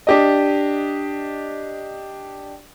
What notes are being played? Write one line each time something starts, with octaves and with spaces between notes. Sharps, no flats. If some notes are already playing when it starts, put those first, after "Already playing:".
D4 G4 D#5